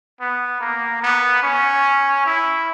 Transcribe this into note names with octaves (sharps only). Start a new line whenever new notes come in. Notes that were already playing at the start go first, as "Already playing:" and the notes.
B3
A#3
B3
C#4
E4